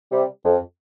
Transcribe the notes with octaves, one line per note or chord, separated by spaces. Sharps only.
C3 G3
F2